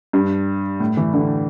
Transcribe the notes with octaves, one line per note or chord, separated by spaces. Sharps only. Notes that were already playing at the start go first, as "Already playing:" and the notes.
G2
A2
E3
D3